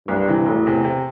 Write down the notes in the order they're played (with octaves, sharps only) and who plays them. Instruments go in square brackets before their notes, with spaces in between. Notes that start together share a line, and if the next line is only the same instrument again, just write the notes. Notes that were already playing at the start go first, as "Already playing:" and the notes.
[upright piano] C2 [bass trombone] G2
[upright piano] C3 E3
[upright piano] E1 [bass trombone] A2
[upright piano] E2 C3
C3